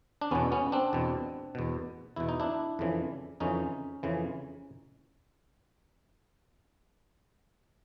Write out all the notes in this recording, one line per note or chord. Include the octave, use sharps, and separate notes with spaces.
D4
E2 B2 B3 C#4
B3 C#4
C4 D4
E2 B2
E2 B2
E2 B2 E4
D#4
D4 E4
F2 C#3 E3
F2 C#3 E3 C#4 D#4
F2 C#3 E3